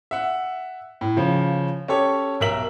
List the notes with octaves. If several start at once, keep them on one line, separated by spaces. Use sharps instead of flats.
E5 F#5
A2
C#3 F3
C#4 G4 A4 C#5
B1 A#4 E5 B6 F#7